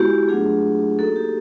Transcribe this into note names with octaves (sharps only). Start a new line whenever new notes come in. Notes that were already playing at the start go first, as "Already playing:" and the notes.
Already playing: G#3 B3 E4 F#4 G4
F#3 A3 D4 F4 G#4
A#3 D#4 F#4 A4
G4